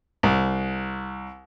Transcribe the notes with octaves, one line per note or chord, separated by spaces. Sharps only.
C2